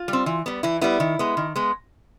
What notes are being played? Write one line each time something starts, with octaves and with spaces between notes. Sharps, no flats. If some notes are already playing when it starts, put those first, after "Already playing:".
Already playing: F4
G3
C4
E3
G3 B3
E3 E4
G3 B3 E4
D#3
G#3 B3
D#3
G#3 B3